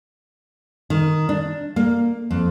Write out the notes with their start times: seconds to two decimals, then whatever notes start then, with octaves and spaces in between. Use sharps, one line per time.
0.90 D#3
1.29 D4
1.76 A#3
2.31 F2